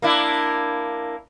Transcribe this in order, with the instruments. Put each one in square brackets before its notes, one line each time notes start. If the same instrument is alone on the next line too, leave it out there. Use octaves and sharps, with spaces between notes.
[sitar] A#3 D4 E4